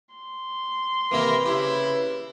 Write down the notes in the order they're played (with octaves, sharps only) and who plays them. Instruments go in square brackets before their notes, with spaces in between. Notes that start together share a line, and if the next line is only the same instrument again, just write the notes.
[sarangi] C6
[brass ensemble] C3 A#4 [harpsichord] E3 A#3 E4 [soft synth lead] B4
[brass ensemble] C#3 E4 [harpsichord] G4